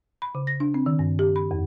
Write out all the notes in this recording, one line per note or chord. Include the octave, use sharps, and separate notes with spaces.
B5
C#3
A#6
D4
C4
D#3
G2
G4
B5
F2